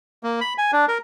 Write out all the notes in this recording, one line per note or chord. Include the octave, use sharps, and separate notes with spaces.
A#3
B5
G#5
D4
A#4